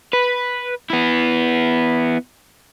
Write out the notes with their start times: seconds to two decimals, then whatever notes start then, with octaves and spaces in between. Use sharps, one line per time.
0.13 B4
0.90 B3 E4